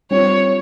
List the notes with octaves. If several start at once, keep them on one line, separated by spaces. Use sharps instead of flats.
G3 C4 F4 C#5